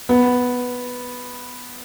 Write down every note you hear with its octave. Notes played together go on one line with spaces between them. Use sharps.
B3